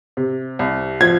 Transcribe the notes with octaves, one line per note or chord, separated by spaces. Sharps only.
C3
C2
F3 G#6